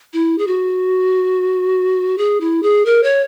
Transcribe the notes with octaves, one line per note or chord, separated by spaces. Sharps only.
E4
G#4
F#4
G#4
E4
G#4
A#4
C#5